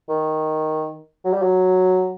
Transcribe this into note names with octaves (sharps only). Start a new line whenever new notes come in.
D#3
F#3
G3
F#3